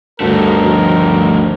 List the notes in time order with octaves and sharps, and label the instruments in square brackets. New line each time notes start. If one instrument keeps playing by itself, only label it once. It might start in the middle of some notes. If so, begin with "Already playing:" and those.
[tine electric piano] D2 G2 D3 [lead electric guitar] D#3 A3 [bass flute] F#4 [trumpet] A#4
[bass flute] F3